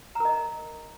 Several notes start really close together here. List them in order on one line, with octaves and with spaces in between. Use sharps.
A#5 A#4 D#5